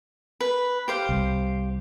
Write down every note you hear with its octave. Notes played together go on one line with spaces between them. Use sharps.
B4
G4 C5 F5
C2